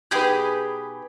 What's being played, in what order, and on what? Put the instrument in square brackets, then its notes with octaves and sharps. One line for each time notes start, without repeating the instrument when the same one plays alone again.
[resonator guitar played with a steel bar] B2 B4 [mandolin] D#4 G4 G#4